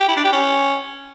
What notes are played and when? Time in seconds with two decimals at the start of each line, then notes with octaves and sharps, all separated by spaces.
0.01 G4
0.08 E4
0.16 D4
0.24 G4
0.32 C#4